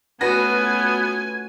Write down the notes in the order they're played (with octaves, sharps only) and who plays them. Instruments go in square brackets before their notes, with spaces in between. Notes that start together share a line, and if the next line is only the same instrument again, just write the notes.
[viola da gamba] A3 C#4 F4 [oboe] B3 [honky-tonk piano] F#4 B4 A#6 [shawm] G#5